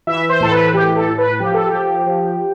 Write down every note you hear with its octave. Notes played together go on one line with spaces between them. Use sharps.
E3 E5
C5
A2 A4
B4
E3 G4
A4
A2
B4
F3 G4
A4
G4
F3
F3